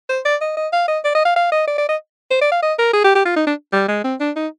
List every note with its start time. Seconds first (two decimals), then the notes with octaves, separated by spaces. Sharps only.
0.09 C5
0.25 D5
0.41 D#5
0.57 D#5
0.73 F5
0.88 D#5
1.04 D5
1.15 D#5
1.25 F5
1.36 F5
1.52 D#5
1.67 D5
1.78 D5
1.89 D#5
2.31 C5
2.41 D5
2.52 F5
2.62 D#5
2.79 A#4
2.93 G#4
3.04 G4
3.15 G4
3.25 F4
3.36 D#4
3.47 D4
3.73 G3
3.88 G#3
4.04 C4
4.20 D4
4.36 D#4